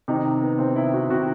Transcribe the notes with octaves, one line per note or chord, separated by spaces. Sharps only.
C3 D#3 D#4
B3
C3 D#3 C4
E4
F#4
C3 D#3 F#4